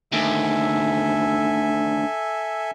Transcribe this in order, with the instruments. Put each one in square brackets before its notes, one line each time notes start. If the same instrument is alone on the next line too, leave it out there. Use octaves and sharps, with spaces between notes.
[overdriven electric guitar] D2 D#3 [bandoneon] A4 E5 G#5